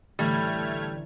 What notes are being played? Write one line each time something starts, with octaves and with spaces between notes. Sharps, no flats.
A1 D3 E3 G3 A3 F6 G#6